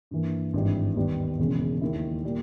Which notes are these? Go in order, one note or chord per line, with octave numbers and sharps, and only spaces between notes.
G2 E3 A#3
G#1 G2 E3 G3
D#2 D#3 G3 B3
E1 E2 C#3
D#2 D#3 A#3 E4
A#2 G3 A#3